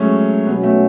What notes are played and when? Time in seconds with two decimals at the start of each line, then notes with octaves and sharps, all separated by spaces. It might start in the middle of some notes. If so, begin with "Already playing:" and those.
Already playing: F#3 G#3 A3 C#4
0.47 B2 F#3 B3 C#4 F#4
0.63 A3